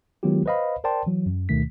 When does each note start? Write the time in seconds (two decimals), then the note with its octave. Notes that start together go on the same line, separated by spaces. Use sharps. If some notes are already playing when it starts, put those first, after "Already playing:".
0.23 D#3 F#3 G#3 B3 F4 G4
0.46 B4 C5 D#5 F5 B5
0.84 A#4 C5 D5 G5 A5 C6
1.07 E3 F#3
1.26 F#2
1.49 D2 B2 D#3 A3 B6